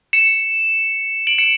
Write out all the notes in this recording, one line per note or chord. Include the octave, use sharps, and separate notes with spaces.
C#7 E7
D7 F#7
C#7 E7